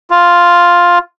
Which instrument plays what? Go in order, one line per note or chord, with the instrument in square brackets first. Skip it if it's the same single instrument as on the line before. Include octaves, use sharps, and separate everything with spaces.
[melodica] F4